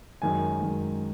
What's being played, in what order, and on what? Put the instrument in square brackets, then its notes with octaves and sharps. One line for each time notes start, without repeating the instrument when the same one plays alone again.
[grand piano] F#2 D#3 G#3 G#5
F#2 D#3 G#3